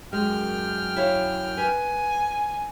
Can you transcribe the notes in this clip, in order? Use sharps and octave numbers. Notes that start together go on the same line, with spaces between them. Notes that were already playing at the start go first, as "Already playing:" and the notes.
F#2 G#3 G5 F6
E4 C#5 F5
B4 G#5